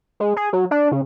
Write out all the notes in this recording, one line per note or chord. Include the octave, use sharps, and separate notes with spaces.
G#3
G#4
F#3
D4
C#3